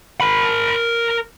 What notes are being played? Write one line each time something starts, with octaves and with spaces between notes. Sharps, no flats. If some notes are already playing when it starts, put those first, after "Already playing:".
A#4 B5